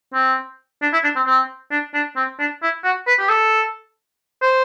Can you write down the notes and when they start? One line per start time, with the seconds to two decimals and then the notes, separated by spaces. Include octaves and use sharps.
0.14 C4
0.82 D4
0.93 E4
1.04 D4
1.16 C4
1.27 C4
1.71 D4
1.94 D4
2.17 C4
2.40 D4
2.63 E4
2.84 F#4
3.07 B4
3.19 G4
3.30 A4
4.42 C5